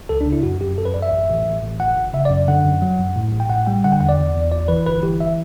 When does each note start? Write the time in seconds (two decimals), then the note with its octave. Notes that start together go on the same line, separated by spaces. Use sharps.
0.09 C#2 A4
0.21 D4
0.26 C#3
0.32 E4
0.43 F#2 F#4
0.60 F#2 G4
0.78 F#2 A4
0.85 B4
0.94 F#2 D5
1.02 E5
1.11 A1
1.29 A1
1.46 A1
1.62 A1
1.80 G1 F#5
1.97 G1
2.13 C#3 E5
2.25 D5
2.30 F#2
2.48 D3 F#5
2.64 F#2
2.82 F#3
2.99 F#2
3.16 A2
3.32 A1
3.40 G5
3.49 A2 F#5
3.66 G3 G5
3.84 D3 F#5
3.92 G5
4.00 E2 F#5
4.09 D5
4.18 E2
4.34 E2
4.52 G1 D5
4.68 E3 B4
4.86 G1 B4
5.03 E3 G4
5.20 E5